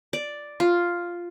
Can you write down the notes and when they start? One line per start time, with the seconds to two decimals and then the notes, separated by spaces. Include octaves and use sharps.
0.13 D5
0.60 F4